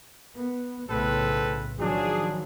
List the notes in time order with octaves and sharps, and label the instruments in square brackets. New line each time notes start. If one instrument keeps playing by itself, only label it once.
[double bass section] B3
[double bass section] B1 A2 C#3 [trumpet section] C4 A4 B4
[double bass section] D#3 F3 F#3 [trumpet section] D4 G#4